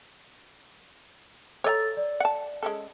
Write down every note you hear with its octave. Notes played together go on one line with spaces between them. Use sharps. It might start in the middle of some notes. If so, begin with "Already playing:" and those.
A4 C#5 D#5 A#5 E6 A6
D5
F#5 A5
G#3 C#4 A4